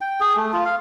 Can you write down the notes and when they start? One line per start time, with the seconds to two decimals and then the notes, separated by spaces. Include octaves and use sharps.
0.01 G5
0.20 G#4
0.36 A3
0.53 F4
0.65 F5